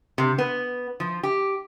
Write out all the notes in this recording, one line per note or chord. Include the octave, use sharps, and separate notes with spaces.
C3
B3
F3
G4